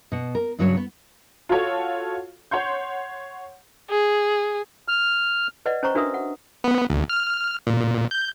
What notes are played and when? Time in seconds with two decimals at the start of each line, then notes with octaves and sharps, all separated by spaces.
0.12 B2 F#5
0.35 A#4
0.59 G2 C#3 F#3 F#4 B4 C#5
0.77 B3
1.49 F4 F#4 A4 C#5
2.51 C#5 F#5 C6 G6
3.90 G#4
4.88 F6
5.66 B4 D5 D#5 F#5
5.83 C#4 C5 A#5 C#6
5.95 D4 F#4 A#4 B4 E5 D#6
6.14 F#5
6.64 B3
6.90 D2
7.09 F6
7.67 A#2
8.11 G6